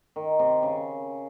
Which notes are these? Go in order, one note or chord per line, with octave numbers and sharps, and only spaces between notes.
D#3
C3
C#3